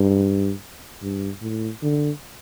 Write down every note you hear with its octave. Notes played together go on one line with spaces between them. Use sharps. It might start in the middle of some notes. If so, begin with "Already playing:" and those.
Already playing: G2
G2
A2
D3